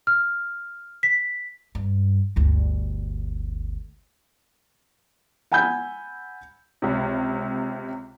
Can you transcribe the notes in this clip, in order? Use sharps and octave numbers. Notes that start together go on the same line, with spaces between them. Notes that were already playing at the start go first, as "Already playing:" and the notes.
F6
B6
G2
G1 D2
F#5 G#5 B5 E6 G6
C#2 C3